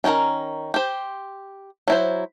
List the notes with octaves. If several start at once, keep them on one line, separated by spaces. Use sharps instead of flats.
D#3 C#4 D#4 A#4 A#5
G4 C5
F#3 E4 C5